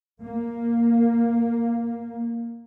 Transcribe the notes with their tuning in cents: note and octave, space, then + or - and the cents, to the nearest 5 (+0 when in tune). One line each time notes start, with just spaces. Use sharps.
A#3 +0